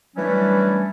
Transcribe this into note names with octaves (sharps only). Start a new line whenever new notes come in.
E3 F#3 G3 A3 C#4 D4